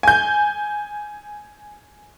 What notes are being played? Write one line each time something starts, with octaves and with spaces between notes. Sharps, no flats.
G#5 G6